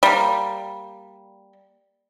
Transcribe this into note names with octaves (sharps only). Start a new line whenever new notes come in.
G3 A#3